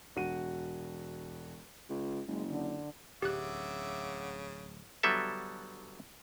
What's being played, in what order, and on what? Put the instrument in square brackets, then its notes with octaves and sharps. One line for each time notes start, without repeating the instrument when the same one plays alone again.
[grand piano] E1 F#4 D#7
[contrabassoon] C#2
[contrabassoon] F#1 [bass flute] G#3
[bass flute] D3
[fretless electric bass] D1 [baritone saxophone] C#3 [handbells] G4 F#6 [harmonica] E5 F#5 D6
[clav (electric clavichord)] D3 F#3 G3 B3 A4 E5